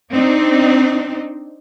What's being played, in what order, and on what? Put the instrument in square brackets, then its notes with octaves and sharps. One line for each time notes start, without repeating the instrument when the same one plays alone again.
[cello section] C4 D4 D#4